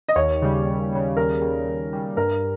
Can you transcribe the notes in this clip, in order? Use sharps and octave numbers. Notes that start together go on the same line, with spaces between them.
D#5
D#2 C#5
C#3 G3
D#2
C#3 G3
D#2 A#4
C#3 G3
D#2
C#3 G3
G2 A#4